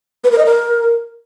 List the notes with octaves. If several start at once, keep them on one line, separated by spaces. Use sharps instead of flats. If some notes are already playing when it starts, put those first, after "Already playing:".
B4
A#4
D#5
A#4